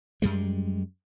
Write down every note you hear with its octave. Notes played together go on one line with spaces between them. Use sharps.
F#2 G3 G#3